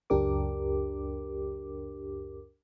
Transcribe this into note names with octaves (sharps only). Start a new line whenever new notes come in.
C#2 F#2 D4 G4 A#4 D6